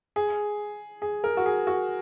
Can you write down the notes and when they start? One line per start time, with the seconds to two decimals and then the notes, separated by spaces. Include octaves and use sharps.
0.16 G#4
1.02 G#4
1.24 A#4
1.37 F#4
1.46 G#4
1.67 F#4